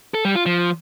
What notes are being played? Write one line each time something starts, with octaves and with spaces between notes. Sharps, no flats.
A4
G3
F4
F3